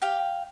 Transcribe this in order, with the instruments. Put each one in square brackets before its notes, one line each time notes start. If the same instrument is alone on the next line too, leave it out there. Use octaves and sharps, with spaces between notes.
[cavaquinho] G4 F5 G5